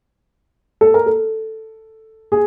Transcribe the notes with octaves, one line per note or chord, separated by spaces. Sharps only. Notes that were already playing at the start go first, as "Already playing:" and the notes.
A4
A#4
A4
G#4